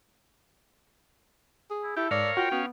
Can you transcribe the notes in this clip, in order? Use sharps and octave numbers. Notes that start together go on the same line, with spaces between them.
G#4
E4
E4 G4 A4
G#2 A#4 C#5 D5 F5
F4 F#4 G5
B3 C#4 F5